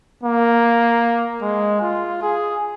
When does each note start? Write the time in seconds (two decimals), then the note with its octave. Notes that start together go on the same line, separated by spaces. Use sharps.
0.23 A#3
1.42 G#3
1.81 F4
2.22 G#4